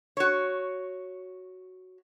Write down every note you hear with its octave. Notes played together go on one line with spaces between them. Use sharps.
F#4 C#5